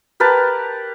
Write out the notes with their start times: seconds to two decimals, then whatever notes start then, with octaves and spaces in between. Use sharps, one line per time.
0.20 G4 A#4 B4 A5